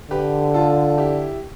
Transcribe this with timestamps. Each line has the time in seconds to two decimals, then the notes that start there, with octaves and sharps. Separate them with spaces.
0.11 D3 G4 B4
0.54 F4 A4
0.98 E4 G4